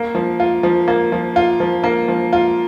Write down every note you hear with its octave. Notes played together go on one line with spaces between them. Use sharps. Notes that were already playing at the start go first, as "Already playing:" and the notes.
Already playing: A#3
F3
F4
F3
A#3
F3
F4
F3
A#3
F3
F4